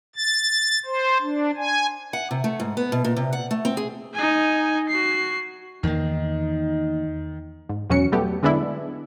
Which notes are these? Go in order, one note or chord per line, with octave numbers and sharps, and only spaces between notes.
A6
C5
D4
G#5
F#5
C3
A3
G#2
B3
B2
A#2
C3
F#5
A3
C4
G#4
D#4 G#5
F#4 C7
E2 D#3 A#3 D#4
G#2
E2 B2 F#3 C#4 F#4 C#7
F#3 G3 A3 B3 G4
D3 G#3 B3 D4 E4